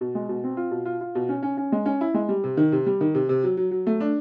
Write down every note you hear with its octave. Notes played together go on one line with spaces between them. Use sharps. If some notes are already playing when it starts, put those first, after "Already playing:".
B2
G#3
B2
C4
F4
B2
F4
F4
B2
C#4
C#4
C#4
G#3
C#4
E4
G#3
G3
C3
D#3
C3
G3
D#3
C3
C3
F#3
F#3
F#3
A3
D4